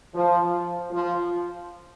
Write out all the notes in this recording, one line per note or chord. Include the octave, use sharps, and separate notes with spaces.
F3
F3